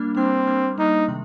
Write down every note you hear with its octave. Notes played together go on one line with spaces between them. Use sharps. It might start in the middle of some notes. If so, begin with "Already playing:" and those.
Already playing: G3 A#3 D4
G3 A#3 C4 D4
G3 A#3 D4
G3 A#3 D4 D#4
C3 D#3 G#3